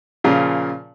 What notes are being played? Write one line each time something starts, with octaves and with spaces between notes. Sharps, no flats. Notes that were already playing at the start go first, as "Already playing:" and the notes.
A#2 C#3 F3 F4 G#4